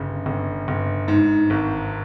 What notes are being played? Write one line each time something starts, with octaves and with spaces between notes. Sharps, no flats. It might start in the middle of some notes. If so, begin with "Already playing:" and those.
Already playing: G1 C#3
G1
G1
G#2
G#1